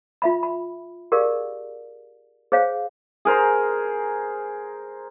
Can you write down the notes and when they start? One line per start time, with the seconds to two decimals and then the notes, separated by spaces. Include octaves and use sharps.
0.22 F4 E5 B5
0.43 B5
1.12 G4 G#4 A#4 D5 F5
2.52 G#4 C5 C#5 F5
3.25 G#4 A#4 C5